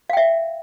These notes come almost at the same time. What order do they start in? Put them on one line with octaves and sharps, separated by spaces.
F5 G5 E5